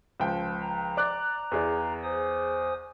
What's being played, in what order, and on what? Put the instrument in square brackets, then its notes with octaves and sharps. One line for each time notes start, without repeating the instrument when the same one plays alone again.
[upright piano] C#2 F3 G5
[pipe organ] A#5
[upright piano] D5 D6 F#6
E2 G#4 D5
[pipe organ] C5 G#5 D#6